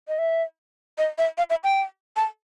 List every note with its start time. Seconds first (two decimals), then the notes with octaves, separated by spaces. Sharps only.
0.08 D#5
0.19 E5
0.98 D#5
1.18 E5
1.38 F5
1.50 E5
1.64 G5
2.16 A5